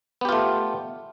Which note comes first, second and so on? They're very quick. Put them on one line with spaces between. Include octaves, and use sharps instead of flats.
B3 G4 F4 A3